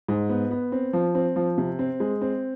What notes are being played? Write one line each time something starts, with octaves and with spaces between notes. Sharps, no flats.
G#2
B3
B3
C4
F3
C4
F3
C3
C4
G#3
C4